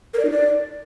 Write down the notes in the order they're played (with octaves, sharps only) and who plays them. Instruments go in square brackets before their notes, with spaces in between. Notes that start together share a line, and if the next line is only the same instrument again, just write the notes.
[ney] A#4
D5
D#4
D5